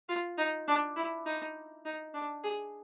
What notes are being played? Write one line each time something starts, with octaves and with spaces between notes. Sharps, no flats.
F4
D#4
D4
E4
D#4
D#4
D4
G#4